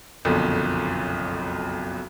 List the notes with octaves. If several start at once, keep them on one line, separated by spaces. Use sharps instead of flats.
F#1 B1 F2 D3